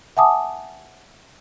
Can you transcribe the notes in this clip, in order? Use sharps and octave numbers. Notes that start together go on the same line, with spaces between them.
E5 F#5 G#5 A5 D6 D#6